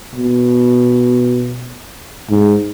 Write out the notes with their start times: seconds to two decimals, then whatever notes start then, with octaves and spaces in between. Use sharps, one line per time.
0.15 B2
2.31 G#2